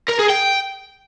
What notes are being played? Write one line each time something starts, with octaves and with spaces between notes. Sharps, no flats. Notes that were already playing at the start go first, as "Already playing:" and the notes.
A#4
G#4
G5